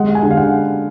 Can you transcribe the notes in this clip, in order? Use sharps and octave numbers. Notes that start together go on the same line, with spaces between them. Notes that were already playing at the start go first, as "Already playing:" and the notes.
Already playing: G#3 F#5
G#5
D3
F5
F#5